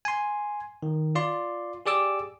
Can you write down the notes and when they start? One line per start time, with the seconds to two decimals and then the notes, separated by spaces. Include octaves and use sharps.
0.05 G#5 C6
0.83 D#3
1.15 F4 D5 C6
1.86 G4 G#4 D5 D6 E6